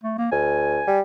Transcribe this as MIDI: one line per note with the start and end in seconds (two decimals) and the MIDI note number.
0.04 0.15 57
0.18 0.27 58
0.32 0.82 38
0.32 0.97 80
0.87 1.00 55